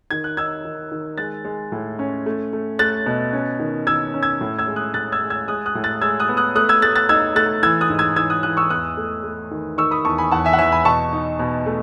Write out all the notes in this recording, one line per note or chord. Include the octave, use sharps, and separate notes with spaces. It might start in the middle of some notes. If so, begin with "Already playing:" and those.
D#3 G#6
F#6
D#4 E6 G#6
D#3
D#3
G#3 F#6 A6
G#3
A2
C#4
A3
A3
A3 F#6 A6
B2
C#4
D#3
D#3 E6 G#6
C#4
E6 G#6
A2
E6 G#6
G#3
D#6 F#6
A2 F#6 A6
E6 G#6
G#3
E6 G#6
G#3 D#6 F#6
D#6 F#6
A2
F#6 A6
G#3 E6 G#6
D#6 F#6
B3
D#6 F#6
A3 D#6 F#6
E6 G#6
A3 F#6 A6
F#6 A6
D#4 E6 G#6
A3 F#6 A6
E3 E6 G#6
D#6 F#6
G#2
E6 G#6
E3 E6 G#6
D#6 F#6
E3 D#6 F#6
C#6 E6
E2 D#6 F#6
A3
A3
D#3
D#3 C#6 E6
B5 D#6
E2 A5 C#6
G#5 B5
E2 F#5 A5
E5 G#5
F#5
E2 E5 G#5
G#5 B5
B2 A5 C#6
D#4
B2
A3